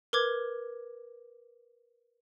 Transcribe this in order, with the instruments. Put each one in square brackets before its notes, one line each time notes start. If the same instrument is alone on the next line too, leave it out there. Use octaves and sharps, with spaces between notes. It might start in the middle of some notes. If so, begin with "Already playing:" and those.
[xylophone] A#4 B4 D6 G#6